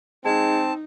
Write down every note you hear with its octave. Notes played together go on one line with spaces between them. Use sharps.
G#3 C4 D#4 A5